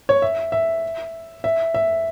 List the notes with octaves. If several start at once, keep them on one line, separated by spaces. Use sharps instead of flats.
C#5
E5
E5
E5
E5